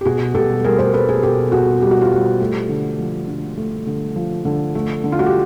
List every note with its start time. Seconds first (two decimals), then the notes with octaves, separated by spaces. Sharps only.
0.01 G4
0.05 B2 F#4 G#4
0.35 B2 G4 A4
0.64 G3 G#4 A#4
0.79 A#4 C5
0.94 G3 A4 B4
1.09 G#4 A#4
1.22 B2 G4 A4
1.52 B2 F#4 G#4
1.81 G3 G4
1.91 F#4
2.01 F4 G4
2.12 G3
2.40 A3
2.69 D3
2.99 F3
3.28 D3
3.58 A3
3.87 D3
4.16 F3
4.45 D3
4.75 A3
5.04 D3
5.12 F4
5.19 F#4
5.26 G4